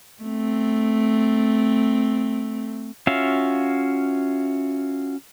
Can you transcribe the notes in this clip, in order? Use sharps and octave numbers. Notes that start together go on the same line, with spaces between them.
A3 C4
C#4 F4 F#4 E5 F5